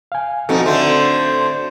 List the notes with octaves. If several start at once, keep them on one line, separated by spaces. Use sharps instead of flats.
F5 G#5
F2 B2 C4 D#4 F#4 A4
D3 A3 C5